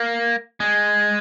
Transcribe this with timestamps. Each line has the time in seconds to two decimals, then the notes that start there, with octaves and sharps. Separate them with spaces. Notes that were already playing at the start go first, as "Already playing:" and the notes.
Already playing: A#3
0.60 G#3